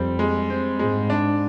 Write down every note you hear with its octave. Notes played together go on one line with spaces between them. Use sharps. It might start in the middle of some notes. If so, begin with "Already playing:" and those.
Already playing: F2 G3 C4
G#3
C4
G#2 G#3
D4